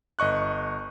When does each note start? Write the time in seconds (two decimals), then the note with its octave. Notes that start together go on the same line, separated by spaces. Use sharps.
0.19 G1 D#5 C#6 F#6